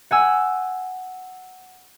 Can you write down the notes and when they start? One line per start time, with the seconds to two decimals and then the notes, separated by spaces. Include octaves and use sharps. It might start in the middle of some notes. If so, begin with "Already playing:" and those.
0.11 F#5 G#5 E6